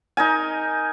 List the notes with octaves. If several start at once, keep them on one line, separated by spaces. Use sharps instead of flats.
D#4 A#4 G#5